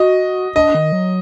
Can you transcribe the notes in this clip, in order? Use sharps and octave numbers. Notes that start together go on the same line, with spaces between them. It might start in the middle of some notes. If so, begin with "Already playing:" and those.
Already playing: F#4 D#5
D4 D#5
D#3
F#3